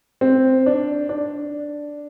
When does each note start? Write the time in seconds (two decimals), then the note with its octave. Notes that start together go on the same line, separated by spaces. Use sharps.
0.21 C4
0.66 D4
1.09 D4